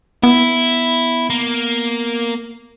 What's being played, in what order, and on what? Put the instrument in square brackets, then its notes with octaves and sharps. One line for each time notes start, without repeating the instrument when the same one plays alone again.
[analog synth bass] B3 [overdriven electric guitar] E4
[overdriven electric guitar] A#3